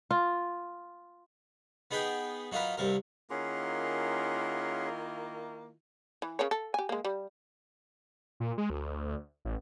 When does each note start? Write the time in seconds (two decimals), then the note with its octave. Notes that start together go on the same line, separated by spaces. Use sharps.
0.11 F4
1.91 B3 D#4 G#4 B4 G5
2.52 F#3 D#4 F4 A#4 B4
2.77 C2 G2 C3 A#4
3.30 D#3 A#3 C#4 E4 F4 G#4 F#5 C6
6.22 E3
6.39 C#3 A#4 C#5
6.51 A4
6.74 G4 G#5
6.89 G#3 A#3
7.05 G3
8.40 A#2
8.58 G#3
8.70 D2
9.45 A1